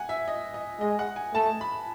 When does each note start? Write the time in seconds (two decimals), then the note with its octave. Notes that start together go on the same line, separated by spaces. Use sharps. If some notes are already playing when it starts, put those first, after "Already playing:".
Already playing: F#5 G#5
0.09 E5
0.28 D#5
0.54 D#5
0.80 G#3 D#5
0.99 F#5
1.16 G#5
1.34 A3 A5
1.61 B5